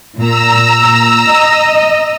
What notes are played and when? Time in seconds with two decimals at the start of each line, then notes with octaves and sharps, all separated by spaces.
0.18 A#2 A#5 E6
0.84 A#2
1.31 D#5